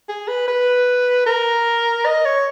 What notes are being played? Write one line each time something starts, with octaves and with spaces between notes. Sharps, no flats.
G#4
B4
B4
A#4
D#5
C#5